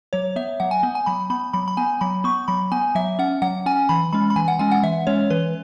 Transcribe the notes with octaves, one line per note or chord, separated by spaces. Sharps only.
F#3 C#5
B3 E5
F#3 F#5
G#5
B3
G#5
F#3 B5
B3 B5
F#3 B5
B5
B3 G#5
F#3 B5
B3 C#6
F#3 B5
B3 G#5
F#3 E5
C#4 F#5
F#3 F#5
C#4 G#5
E3 B5
G#3 C#4 B5
B5
E3 G#5
F#5
G#3 C#4 G#5
F#5
E3 E5
G#3 C#4 C#5
E3 B4